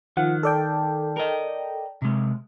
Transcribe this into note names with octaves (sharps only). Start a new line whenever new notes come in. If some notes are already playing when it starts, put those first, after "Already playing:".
D#3 F3 F#5
A4 D5 G5
A#4 D#5
C3 G#3